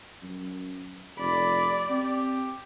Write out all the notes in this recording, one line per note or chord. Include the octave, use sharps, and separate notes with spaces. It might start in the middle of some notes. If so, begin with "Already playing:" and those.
F#2
F1 D5 B5
C4 G4